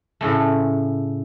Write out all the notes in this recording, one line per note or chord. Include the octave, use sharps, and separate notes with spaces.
A2 C#3 A3